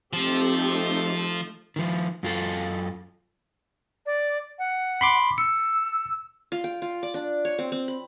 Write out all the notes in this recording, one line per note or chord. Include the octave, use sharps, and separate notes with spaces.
F3 A3 C4 D#4 G4 A4
D#3 F3
F#2 F4 A4
D5
F#5
B5 C6 D6
E6 C#7
F4
G5
F4
D5
D4
C#5
C4
C4
B5